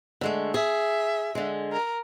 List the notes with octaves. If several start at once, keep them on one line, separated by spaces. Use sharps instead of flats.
D3 G#3 A3
G#4 E5
D3 G#3
A#4